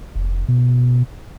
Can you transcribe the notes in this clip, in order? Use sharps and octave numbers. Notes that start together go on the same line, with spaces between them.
F1
B2